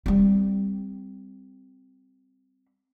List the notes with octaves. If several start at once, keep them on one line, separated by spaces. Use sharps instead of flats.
G3 C4